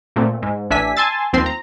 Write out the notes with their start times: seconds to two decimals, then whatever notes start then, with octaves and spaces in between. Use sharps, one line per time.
0.16 A#2 A3 C4
0.42 G#2
0.70 A1 D4 E5 G#5 B6
0.97 G#5 A5 C6 E6 A6
1.33 D#2 F3 C4 C6 C7
1.46 A#5